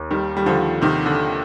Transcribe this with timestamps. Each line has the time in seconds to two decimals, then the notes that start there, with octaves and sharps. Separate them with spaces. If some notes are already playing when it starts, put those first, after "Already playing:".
Already playing: D#2
0.11 D#3 G3
0.37 G3
0.46 D3 F3
0.82 C3 D#3
1.06 D3